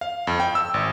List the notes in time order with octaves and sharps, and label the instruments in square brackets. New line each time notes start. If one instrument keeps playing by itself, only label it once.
[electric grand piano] F5
F2
G5
E6
G#1